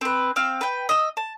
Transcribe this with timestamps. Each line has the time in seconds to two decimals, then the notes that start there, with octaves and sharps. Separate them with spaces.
0.01 C4 B4
0.36 C4 F5
0.61 B4 G5
0.89 D#5 E6
1.17 A5